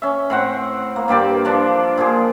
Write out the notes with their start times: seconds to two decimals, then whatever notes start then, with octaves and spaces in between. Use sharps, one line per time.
0.02 C#4 E5
0.30 A2 C4 F#5
0.96 A#3
1.08 G2 A#3 G4 D5
1.45 F3 D4
1.97 A#2 F3 F4 G#4